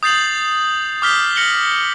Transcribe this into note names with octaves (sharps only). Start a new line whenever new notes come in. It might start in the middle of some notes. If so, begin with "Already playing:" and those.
D#6 G6 A6 C7 F7 F#7
D6 D#6 F6 G6 B6 G7
F6 A#6 C#7 F#7 G7